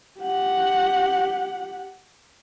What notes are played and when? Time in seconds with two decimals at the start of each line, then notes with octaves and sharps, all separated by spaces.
0.20 G4 F#5